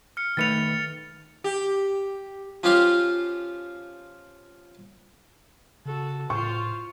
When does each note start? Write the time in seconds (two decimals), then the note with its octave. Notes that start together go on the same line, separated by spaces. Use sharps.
0.17 F6 C#7
0.37 D#3 A3 B4 A6 C#7 F7
1.44 G4
2.63 F3 C#4 F4 G4 F5 C6
5.85 C#3 F#4 A4
6.30 A2 F4 C5 C#6